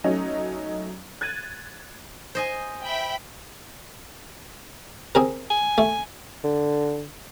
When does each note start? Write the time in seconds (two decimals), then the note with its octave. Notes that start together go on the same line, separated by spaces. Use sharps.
0.04 F#3 A3 C#4 D#4
1.21 F#6 G#6 A6 D#7
2.35 C5 D#5 G#5
2.83 E5 G5 B5
5.15 C4 G#4 A#4
5.50 G#5
5.78 A3
6.44 D3